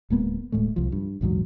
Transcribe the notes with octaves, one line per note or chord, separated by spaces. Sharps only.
D1 G#3 A#3 B3
D1 A2 G#3 A3
C2 F3
G2
A#1 E2 G#2 F#3